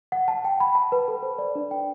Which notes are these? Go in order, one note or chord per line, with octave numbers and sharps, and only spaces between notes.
F#5
A5
G5
B5
A5
B4
A4
C5
D5
D4
G5